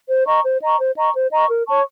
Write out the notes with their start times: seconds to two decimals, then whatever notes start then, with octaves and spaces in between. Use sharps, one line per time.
0.08 C5
0.26 D#5 A#5 C#6
0.43 C5
0.61 D#5 A#5 C#6
0.78 C5
0.96 D#5 A#5 C#6
1.14 C5
1.30 D#5 A#5 C#6
1.48 A#4
1.67 C#5 A5 C#6